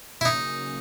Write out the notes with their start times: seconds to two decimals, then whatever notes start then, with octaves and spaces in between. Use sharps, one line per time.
0.21 E4
0.25 C#3 F#3 A#3 C#4 D#4